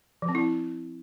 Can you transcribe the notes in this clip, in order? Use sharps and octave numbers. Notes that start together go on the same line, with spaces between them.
F3
C4
E4